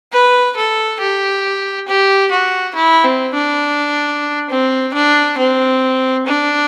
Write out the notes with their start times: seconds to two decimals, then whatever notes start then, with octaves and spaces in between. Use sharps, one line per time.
0.12 B4
0.56 A4
1.00 G4
1.88 G4
2.31 F#4
2.75 E4
3.04 C4
3.33 D4
4.50 C4
4.94 D4
5.38 C4
6.26 D4